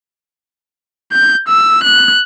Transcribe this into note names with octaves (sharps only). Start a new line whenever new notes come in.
G6
E6
F#6